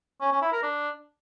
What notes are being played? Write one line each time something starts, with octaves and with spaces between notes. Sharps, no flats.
C#4
C#4
E4
A#4
D4